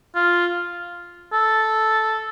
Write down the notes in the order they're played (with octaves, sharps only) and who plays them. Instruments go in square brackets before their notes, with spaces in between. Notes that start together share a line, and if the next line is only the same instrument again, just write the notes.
[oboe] F4
A4